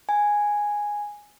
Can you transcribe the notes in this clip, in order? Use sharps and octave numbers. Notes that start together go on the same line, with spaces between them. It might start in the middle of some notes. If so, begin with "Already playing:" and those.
G#5